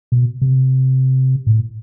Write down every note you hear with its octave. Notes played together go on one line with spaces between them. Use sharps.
B2
C3
A2